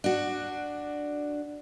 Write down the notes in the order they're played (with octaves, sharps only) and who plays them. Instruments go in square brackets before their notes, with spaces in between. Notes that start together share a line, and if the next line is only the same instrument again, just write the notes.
[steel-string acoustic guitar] D4 F#4